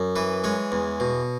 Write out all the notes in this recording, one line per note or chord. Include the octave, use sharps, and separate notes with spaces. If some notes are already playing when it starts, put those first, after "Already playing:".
Already playing: F#2
E3 B4
G#3 C#5
E2
B2